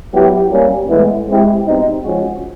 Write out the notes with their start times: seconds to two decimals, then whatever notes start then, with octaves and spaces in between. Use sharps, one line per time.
0.13 F#3 B3 E4 G4
0.51 G3 A#3 C#4
0.89 A2 E3 G#3 B3 E4
1.28 G#3 C4 E4 G4
1.66 B2 G3 C4 D#4
2.04 F3 G#3 C#4 F#4